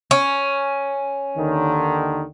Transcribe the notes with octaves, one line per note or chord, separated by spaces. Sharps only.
C#4
D#2 D3 D#3